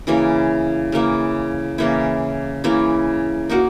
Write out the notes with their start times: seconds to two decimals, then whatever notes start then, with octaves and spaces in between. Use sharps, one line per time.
0.07 C#3 E3 A#3 E4
0.92 C#3 E3 A#3 E4
1.78 C#3 E3 A#3 E4
2.64 C#3 E3 A#3 E4
3.49 A#3 D#4 F#4 A#4